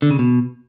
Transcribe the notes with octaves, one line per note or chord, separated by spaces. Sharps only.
D3
C#3
B2